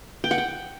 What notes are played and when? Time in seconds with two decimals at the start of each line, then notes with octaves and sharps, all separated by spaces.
0.24 G5
0.31 F#5
0.38 G5